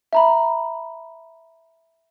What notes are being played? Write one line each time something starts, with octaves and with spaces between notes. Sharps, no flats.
E5 A#5 B5